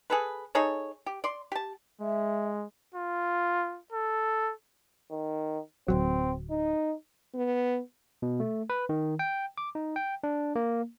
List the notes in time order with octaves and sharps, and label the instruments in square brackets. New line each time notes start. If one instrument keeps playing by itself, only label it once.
[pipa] G#4 A4 B4
D#4 G#4 A4 C#5
G4
D5 C6
G4 A5
[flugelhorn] G#3 [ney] E5
[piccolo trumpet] F4
A4
[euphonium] D#3
[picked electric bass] D1 B1 F#3 [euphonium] C4
[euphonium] D#4
[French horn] B3
[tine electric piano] B2
A3
B4
D#3
G5
D6
D#4
G5
D4
A#3